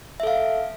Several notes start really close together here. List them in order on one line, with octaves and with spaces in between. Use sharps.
E5 A4 F5